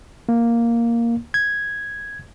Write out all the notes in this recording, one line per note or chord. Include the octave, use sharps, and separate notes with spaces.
A#3
G#6